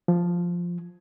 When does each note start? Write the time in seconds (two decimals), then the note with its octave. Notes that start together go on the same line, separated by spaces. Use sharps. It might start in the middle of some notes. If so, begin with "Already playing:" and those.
0.08 F3